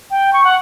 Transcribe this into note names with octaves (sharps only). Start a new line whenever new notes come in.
G5
C#6
F#5